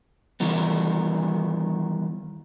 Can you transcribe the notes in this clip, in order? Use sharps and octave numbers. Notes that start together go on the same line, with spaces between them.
D#3 E3 G3 B3